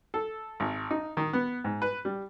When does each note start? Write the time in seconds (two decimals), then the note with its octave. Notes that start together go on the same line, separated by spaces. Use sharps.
0.14 A4
0.60 G#1
0.91 D#4
1.17 D#3
1.33 B3
1.64 G#2
1.82 B4
2.05 G3